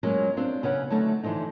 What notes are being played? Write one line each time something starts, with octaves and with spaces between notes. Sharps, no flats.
F#3 G#3 A#3 C#4 F4
C4 D4 F4
C#3 C#4 B4 F#5
D3 F#3 A3 D#4
D3 E3 F3 A3 D#4